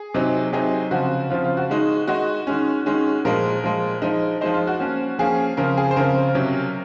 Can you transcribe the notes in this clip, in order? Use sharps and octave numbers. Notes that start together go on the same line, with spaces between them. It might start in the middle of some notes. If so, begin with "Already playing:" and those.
Already playing: G#4
C3 F#3 C4 D#4
C3 F#3 C4 D#4 G#4
C#3 F3 C4 F#4
C#3 F3 C4 F4
F4
F#4
D#3 G#3 D#4
D#3 G#3 D#4 F#4
D#3 G#3 C#4
D#3 G#3 C#4
A#2 F3 G#3 A#4
A#2 F3 G#3
F3 G#3 D#4
F3 G#3 D#4 C5
F4
F#4
F3 A#3 C#4
F3 A#3 C#4 G#4
C#3 F3 C4 A#4
G#4
C5
C#3 F3 C4 A#4
C3 F#3 C#4